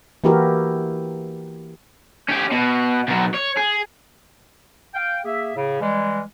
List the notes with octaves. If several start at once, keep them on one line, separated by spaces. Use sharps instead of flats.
E3 A#3 E4 F#4 G4 A#4
C#4 G4
B2
B2 F#3
C#5
G#4
F5 G5
A#3 G#4 E5
A2 C#3
E3 G3 G#3